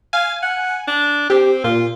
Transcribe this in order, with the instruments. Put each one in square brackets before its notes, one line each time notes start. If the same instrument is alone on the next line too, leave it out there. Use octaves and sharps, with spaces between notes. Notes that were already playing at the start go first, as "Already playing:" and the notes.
[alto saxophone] F5 [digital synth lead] G#5
[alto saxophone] F#5
D4
[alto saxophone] C4 [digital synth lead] G4
[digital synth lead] A#2 [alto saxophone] F4